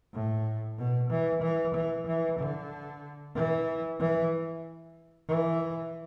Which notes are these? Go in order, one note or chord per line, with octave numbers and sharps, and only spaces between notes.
A2
B2
E3
E3
E3
E3
D3
E3
E3
E3